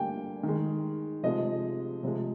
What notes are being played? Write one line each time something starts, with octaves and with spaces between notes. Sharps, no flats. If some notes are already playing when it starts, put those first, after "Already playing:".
Already playing: D3 G3 A#3 G5 G#5
D#3 G#3
C3 F3 G#3 D#5
C3 F3 G#3